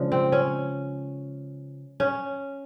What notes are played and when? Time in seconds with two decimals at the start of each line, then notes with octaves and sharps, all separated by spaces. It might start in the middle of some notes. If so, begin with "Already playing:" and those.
Already playing: C#3 F3 G#3 D4
0.12 C4
0.32 C#4
2.00 C#4